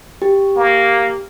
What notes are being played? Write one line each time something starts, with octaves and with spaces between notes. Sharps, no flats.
G4
A#3